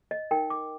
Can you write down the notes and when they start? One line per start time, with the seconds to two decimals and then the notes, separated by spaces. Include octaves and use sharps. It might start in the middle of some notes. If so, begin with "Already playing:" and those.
0.11 D#5
0.31 D#4 A#4 G5
0.50 D6